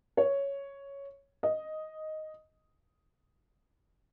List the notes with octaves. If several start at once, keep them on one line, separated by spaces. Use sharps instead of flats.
C#5
D#5